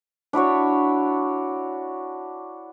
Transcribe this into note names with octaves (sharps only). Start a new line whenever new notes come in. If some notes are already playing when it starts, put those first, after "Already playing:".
D4 E4 F#4 C#5